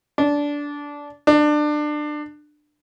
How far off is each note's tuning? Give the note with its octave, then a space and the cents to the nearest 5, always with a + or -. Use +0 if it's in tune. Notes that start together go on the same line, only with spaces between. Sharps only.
D4 -15
D4 +25